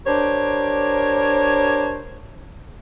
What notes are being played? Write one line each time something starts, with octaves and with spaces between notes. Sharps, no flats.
D4 G4 A#4 C5 C#5